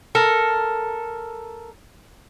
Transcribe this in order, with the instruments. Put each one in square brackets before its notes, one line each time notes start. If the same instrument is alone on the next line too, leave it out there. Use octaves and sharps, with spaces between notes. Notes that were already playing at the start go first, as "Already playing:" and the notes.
[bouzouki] A4 A#4